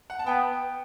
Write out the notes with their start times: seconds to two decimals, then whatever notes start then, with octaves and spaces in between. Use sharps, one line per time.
0.10 F#5
0.19 A5
0.26 B3 G5